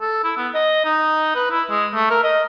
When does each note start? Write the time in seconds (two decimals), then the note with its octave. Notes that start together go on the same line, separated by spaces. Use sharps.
0.01 A4
0.24 E4
0.37 B3
0.55 D#5
0.85 D#4
1.35 B4
1.51 E4
1.70 G#3
1.94 A3
2.11 A#4
2.23 D#5